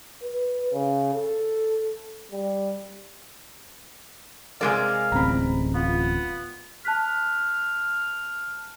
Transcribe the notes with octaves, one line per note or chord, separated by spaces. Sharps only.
B4
C#3
A4
G3
C3 G#3 A#4 D5 F5 G#5
D1 A1 C4 A#5 B5
B3 F4
A5 F6 F#6 B6